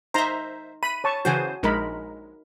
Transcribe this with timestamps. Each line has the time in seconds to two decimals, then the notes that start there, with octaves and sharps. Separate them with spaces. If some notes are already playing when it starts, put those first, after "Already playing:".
0.14 D#4 C5 E5 A#5 C6
0.83 B5 D#7
1.04 C#5 A5 C#6
1.25 C#3 E3 F#4 C5 G#5
1.63 A#1 G#3 D#4 A#4 B5